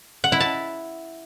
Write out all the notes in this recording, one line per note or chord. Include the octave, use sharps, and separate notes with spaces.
F#5
E4
A5